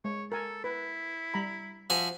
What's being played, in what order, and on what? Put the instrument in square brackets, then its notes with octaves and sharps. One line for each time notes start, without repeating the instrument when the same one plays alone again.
[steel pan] G#3 [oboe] C#5
[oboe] A4 [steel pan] A#4 G#5
[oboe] E4 [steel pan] B4
[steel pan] G3 A#5 B5
[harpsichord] F3 F#4 G#5 [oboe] E5